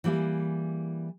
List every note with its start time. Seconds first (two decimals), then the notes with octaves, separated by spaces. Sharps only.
0.04 E3 G3 A#3 E4 G#4